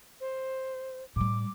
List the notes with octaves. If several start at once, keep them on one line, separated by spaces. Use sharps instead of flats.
C5
A2 G3 D6